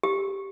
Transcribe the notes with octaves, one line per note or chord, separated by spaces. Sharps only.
G4